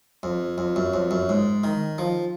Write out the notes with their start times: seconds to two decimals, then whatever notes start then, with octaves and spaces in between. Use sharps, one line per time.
0.23 F2
0.58 F2
0.76 F#2
0.94 F2
1.11 F#2
1.29 G#2
1.64 D#3
1.98 F3